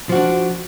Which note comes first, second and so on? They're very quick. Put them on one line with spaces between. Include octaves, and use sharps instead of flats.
F3 F#4 D4